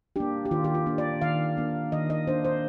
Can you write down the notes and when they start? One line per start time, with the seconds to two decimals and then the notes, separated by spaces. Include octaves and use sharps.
0.16 A#3 D4 G4
0.45 G4
0.51 D#3 F4
0.64 G4
0.74 F4
0.86 A#3 D4
0.98 D5
1.21 D#3 F5
1.57 A#3 D4
1.92 D#3 D#5
2.10 D#5
2.27 A#3 D4 C5
2.45 C5